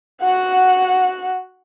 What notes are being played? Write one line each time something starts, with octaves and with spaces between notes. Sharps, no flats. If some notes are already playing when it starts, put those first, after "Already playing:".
F#4 F#5